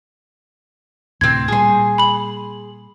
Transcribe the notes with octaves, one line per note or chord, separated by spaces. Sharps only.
D2 A2 C3 C4 C6 G#6
A#2 G3 G#4 C6
B5 F#7